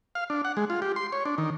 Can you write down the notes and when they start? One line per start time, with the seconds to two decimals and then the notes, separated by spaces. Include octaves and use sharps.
0.15 F5
0.30 D4
0.45 F#5
0.57 G#3
0.70 F4
0.82 G4
0.96 C6
1.12 C#5
1.25 D4
1.38 D#3